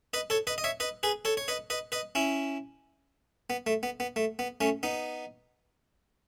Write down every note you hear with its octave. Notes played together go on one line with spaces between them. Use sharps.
B4 D#5
A4 C#5
B4 D#5
D#5
C#5 E5
B4 D#5
G#4 B4
A4 C#5
C#5
B4 D#5
B4 D#5
B4 D#5
C#4 E4
B3
A3
B3
B3
A3
B3
A3 C#4
B3 D#4